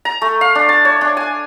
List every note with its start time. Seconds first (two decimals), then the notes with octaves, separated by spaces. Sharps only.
0.05 A#5
0.22 A3
0.41 F5
0.55 D4
0.69 A5
0.85 C#5
1.01 D4
1.17 G#5